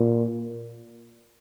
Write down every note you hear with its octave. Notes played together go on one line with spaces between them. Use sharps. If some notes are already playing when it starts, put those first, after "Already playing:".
Already playing: A#2